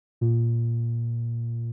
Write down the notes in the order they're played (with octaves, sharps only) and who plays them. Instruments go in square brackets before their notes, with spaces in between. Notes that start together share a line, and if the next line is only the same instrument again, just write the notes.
[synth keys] A#2